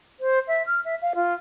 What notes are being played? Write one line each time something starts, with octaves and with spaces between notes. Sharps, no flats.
C5
E5
F6
E5
F5
F4